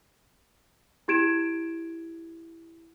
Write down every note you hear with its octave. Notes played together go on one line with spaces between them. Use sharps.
E4 G4 G#6 D7 E7